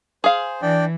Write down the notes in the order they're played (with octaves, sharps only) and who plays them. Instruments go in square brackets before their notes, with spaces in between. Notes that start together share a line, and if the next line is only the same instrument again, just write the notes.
[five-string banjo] G#4 F5 [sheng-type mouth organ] C5
[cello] E3 [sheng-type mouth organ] D4 D5 G5